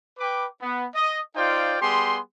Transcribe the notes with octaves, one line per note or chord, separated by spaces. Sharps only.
B4 G5 B5 D6
B3
D#5
D#4 F4 C5 D5 F5 G5
G3 B3 G4 G#4 C6